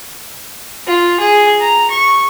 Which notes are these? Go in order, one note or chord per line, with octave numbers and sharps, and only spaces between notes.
F4
G#4
A#5
C#6